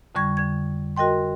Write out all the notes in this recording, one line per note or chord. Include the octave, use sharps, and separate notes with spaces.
F2 D3 G3 C#6 G#6
D3 G#6
F#4 A#4 D#5 G5 C6